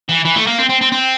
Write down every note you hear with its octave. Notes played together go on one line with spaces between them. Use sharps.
E3
E3
A3
A#3
C4
C4
C4
C4